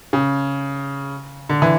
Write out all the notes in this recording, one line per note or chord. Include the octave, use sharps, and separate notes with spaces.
C#3
D3
E3